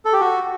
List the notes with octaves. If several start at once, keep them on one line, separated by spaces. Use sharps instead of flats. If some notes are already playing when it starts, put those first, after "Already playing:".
A4
G4
F#4